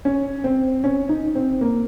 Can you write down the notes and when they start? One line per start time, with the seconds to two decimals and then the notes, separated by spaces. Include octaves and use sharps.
0.05 C#4
0.44 C4
0.84 C#4
1.09 D#4
1.35 C4
1.61 A#3